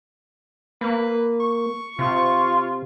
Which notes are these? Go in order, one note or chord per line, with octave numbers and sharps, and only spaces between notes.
A#3 B4
C#6
C3 F4